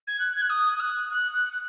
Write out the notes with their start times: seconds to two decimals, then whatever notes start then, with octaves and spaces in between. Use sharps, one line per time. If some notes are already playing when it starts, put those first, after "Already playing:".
0.07 G#6
0.19 F#6
0.35 G#6
0.41 F#6
0.49 D#6
0.72 D#6
0.80 F#6
1.11 F#6
1.34 F#6
1.52 F#6